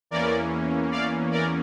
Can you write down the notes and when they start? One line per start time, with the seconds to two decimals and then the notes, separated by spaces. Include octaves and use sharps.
0.11 E2 E3 A#3 C#4 A#4 D5
0.92 D5 F5
1.31 A#4 D5